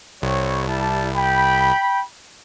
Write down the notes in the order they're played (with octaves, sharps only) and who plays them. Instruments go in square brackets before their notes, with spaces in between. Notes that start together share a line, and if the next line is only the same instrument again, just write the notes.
[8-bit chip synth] C2 [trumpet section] G3 C4 C#5
[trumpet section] G3 E4 A5
G5 B5